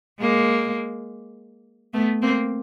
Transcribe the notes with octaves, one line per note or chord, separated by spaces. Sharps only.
G#3 A#3
A3 B3
A#3 C4